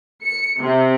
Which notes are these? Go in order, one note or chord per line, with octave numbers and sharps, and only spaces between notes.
C#7
C3